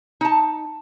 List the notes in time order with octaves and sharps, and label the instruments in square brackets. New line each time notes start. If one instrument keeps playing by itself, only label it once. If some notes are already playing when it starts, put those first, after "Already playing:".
[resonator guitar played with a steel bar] D#4 A5